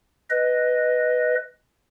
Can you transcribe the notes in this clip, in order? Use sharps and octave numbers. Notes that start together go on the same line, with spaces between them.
B4 D#5